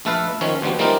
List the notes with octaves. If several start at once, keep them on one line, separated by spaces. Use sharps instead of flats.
A#1 A3 A4 B4 F5
D#3 F3 C#4 C#5
D2 F3 G3 B3
E3 G3 A#3 C4 D#4 F4